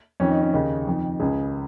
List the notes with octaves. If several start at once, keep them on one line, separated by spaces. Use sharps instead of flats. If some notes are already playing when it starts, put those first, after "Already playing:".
F2 D#3 C#4
D#4
C#4
D#2 C#3 D#4
F2 D#3
C#2 C#3 G#4